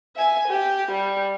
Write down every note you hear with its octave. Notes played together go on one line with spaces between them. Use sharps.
E5 G#5
G4
G3